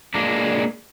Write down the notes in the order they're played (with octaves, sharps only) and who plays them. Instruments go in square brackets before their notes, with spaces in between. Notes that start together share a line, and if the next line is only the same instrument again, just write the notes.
[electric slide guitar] G#3 A#3 D4